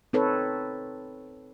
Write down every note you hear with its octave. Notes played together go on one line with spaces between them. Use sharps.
C4 D#4 A4 B4 C#5